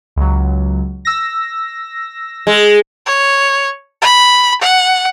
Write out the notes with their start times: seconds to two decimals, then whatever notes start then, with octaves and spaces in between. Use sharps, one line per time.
0.16 C#2 F#3
1.05 E6 A#6
2.47 G#3
3.06 C#5
4.02 B5
4.61 F#5